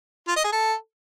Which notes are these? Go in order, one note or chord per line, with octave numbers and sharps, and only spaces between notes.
F4
D#5
G#4
A4